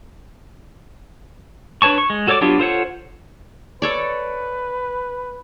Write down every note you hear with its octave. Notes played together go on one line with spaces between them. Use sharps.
D4 B4 C#5 A5 C#6
C#6
G#3
F#4 A4 C#5 D5 D6
F#3 B3 D4 F4 G4
F4 A4 C5 C#5 F#5
A4 B4 C#5 D5